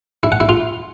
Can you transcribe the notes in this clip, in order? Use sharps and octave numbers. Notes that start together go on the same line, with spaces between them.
E4
F#5
E4
F4